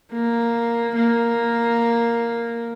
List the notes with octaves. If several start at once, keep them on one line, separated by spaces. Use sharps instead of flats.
A#3
A#3